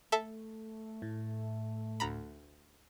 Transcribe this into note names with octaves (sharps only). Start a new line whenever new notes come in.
A3 A4 E5 A5
A2
D2 A#5 B5